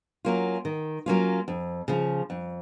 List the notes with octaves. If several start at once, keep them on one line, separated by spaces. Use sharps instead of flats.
F#3 A#3 C#4 F4
D#3
F#3 A#3 C#4 F4
F2
C#3 F3
F2